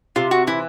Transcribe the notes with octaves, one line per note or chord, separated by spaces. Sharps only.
C3 F4
F#4
E3 E4